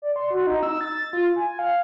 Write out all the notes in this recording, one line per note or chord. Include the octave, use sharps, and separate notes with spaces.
D5
C6
F#4
D#4
E6
A6
F4
G#5
F5